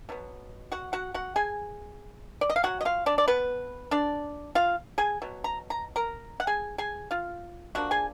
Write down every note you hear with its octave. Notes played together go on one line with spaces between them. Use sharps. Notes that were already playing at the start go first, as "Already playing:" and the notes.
B2 F#3 B3
F#4 F#5
F#4 F#5
F#4 F#5
G#4 G#5
D5
D#5
F5
F#3 D4 F#4 F#5
D#5
F4 F5
D4 D5
D5
B3 B4
D4 D5
F4 F5
G#4 G#5
B2 F#3
A#5
A#5
A#4 A#5
F#5
G#4 G#5
G#4 G#5
F4 F5
D3 F3 A#3 D4 F#4 F#5
G#4 G#5